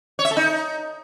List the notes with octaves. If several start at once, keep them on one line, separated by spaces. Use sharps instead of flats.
C#5
E5
A4
D#4